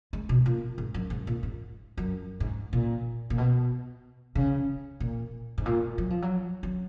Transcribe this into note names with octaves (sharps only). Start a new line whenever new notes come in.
G#3
B2
A#2
G#2
F#2
G#2
A#2
G#2
F#2
G#2
A#2
A#2
B2
C#3
A#2
G#2
A#2
F#3
F3
F#3
F#3